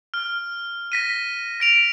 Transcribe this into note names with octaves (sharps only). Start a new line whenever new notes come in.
F6
A#6 B6 D#7
A#6 D7 F7